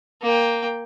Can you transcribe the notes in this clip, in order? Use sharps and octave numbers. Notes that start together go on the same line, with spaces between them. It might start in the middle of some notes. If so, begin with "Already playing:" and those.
A#3 G5